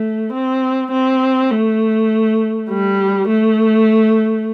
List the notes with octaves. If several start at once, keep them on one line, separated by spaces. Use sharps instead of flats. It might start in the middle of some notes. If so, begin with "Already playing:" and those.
Already playing: A3
C4
C4
A3
G3
A3